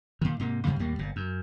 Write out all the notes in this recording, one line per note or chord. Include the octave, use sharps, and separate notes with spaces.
A#2 D#3
G#2 C3 A#3
G#2 C#3 G3 G#3
D#2 A2 G3 A#3
G1 A#2
F#2